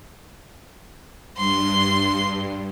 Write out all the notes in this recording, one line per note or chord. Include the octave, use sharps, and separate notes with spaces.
G2 C6